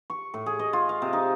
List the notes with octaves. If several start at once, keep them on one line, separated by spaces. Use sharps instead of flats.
C#6
A2
G#4
D#5
F4
F5
C3
D#4